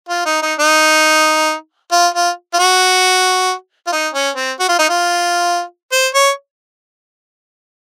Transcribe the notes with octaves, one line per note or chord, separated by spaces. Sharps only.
F4
D#4
D#4
D#4
F4
F4
F4
F#4
F4
D#4
C#4
C4
F#4
F4
D#4
F4
C5
C#5